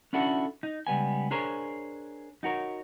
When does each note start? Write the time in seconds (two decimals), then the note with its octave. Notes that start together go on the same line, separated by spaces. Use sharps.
0.13 C#4 D4 E4 F#4 A4
0.63 D#4
0.87 C#2 G3 B3 G#5
1.31 D4 G#4 A#4 C5 C#5
2.43 D#4 F#4 A#4 C#5